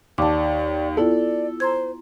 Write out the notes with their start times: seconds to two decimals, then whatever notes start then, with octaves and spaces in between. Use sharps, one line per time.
0.18 D#2 D5 A5 D6
0.97 B3 E4 F4 A4 D5
1.60 C5 A#5 C6 G#6